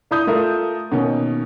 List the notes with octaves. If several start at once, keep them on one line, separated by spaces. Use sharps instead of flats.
D4 E4 B5 D#6 G6
A3 F4 A4 A#4 E5
B2 D#3 A#3 C#4